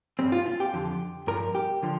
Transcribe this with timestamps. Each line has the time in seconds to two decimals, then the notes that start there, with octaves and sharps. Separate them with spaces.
0.19 G2 G3 C4
0.32 F4
0.46 F4
0.60 G4
0.73 F2 D3 F3
1.27 G2 F3 A#4
1.55 G4
1.83 D3 F3